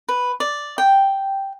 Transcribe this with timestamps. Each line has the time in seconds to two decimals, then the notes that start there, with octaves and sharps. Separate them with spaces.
0.09 B4
0.40 D5
0.78 G5